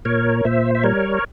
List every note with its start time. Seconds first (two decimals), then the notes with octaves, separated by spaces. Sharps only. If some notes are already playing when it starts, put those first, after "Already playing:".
0.05 A#2 A#4 C#5
0.45 A#2 C5 E5
0.75 E5
0.84 G3 A#4 C#5